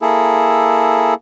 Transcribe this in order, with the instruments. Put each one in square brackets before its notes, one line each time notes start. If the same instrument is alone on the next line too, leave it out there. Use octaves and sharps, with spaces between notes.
[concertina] A#3 E4 G#4 A4